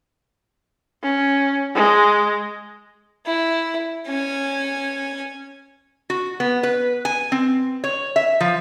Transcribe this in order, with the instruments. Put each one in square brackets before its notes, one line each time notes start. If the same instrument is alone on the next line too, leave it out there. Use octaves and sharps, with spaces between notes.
[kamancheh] C#4
G#3
[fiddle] E4
C#4 G#5
[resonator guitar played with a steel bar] F#4
B3
B4
G#5
C4
C#5
E5
F3